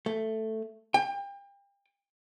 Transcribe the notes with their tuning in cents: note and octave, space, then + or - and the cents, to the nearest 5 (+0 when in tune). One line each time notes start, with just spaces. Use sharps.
A3 +5
G5 +35